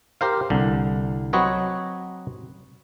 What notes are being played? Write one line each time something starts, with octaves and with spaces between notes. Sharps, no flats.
G4 A#4 C5 F5
C2 D3
F#3 C4 B4 C#5 D#5 F#5